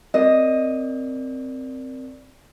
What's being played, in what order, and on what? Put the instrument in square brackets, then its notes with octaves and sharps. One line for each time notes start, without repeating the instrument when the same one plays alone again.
[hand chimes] C4 A#4 D5 [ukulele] D#5